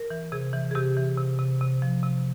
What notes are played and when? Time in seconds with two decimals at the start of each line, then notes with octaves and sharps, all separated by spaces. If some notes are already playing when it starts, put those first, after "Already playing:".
Already playing: A#4
0.10 E3
0.32 C3 G#4
0.53 E3
0.71 G#4
0.75 C3 G4
0.97 E3
1.17 C3
1.39 C3
1.61 C3
1.82 F3
2.03 C3